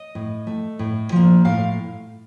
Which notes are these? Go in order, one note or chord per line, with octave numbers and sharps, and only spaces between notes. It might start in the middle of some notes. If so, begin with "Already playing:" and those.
Already playing: D#5
A2
A3
A2
F3 A#3
A2 F5